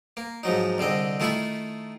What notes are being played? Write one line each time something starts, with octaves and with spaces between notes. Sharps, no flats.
A#3
G#2 F3 F#3 D#4
C2 D3 C4 D#5
D#3 A3 E4 F4 B5 C#6